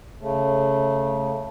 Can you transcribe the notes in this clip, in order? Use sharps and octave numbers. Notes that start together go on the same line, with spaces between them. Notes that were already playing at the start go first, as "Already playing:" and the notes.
C#3 A3